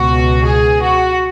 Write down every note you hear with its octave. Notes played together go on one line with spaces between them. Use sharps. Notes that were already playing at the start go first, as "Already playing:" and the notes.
Already playing: C#2 B2 F#4
G#4
F#4